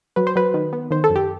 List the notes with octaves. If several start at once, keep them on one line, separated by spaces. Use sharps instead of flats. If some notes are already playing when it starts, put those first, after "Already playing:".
F#3 B4
C5
F#3 B4
D#3
B3
D#3 C5
A4
F#2
G4